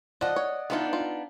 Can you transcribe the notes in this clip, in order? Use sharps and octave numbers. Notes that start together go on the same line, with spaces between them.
F3 D5 D#5 F#5
C#5
E3 B3 D4 D#4 F4
F4